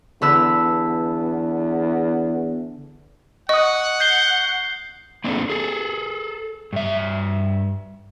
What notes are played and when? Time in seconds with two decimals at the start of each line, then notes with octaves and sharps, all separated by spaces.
0.22 E2 D3 B4 E6
3.49 D#5 F#5 C#6 D#6
4.00 G6 C7 G7
5.24 A#3 C4 D4 F4 G#4 A4
5.50 G#4 A4
6.73 G2 E5